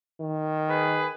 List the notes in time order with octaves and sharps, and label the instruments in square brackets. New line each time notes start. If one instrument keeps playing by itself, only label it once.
[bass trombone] D#3
[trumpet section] G#4 B4